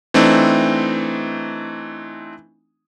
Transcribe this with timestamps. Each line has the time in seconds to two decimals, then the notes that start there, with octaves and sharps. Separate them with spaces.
0.14 E3 A3 C4 D4 D#4